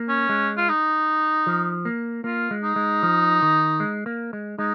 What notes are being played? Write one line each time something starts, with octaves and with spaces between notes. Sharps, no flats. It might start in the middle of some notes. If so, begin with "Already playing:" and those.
Already playing: A#3
C#4
G#3
F4
D#4
F3
A#3
A#3 F4
G#3
D#4
G#3
F3
D#3
G#3
A#3
G#3
G#3 D#4